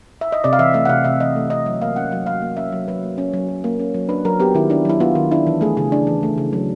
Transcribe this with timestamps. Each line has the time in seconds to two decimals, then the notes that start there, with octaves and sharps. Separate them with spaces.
0.21 E5
0.32 D#5
0.44 C3 D5
0.53 F5
0.59 E3 E5
0.74 A3 E5
0.85 F#5
0.89 C3 F5
1.04 C3 E5
1.20 E3 D#5
1.36 A3
1.50 C3 D#5
1.66 F#3 E5
1.81 A#3 F5
1.96 C#4 F#5
2.11 F#3 F5
2.26 F#3 F5
2.41 A#3
2.57 C#4 E5
2.72 F#3
2.88 F#3 B4
3.03 A#3
3.18 C#4
3.33 F#3
3.49 F#3
3.64 A#3
3.79 C#4
3.94 F#3
4.09 D4 B4
4.25 F#3 A#4
4.40 B3 G4
4.55 D#3 E4
4.70 D4 E4
4.85 F#3 E4
5.00 B3 F4
5.15 D#3
5.31 D4 E4
5.47 E3
5.61 A3 G#4
5.77 C#3 G#4
5.92 D4
6.07 E3
6.23 A3
6.38 C#3
6.53 F#3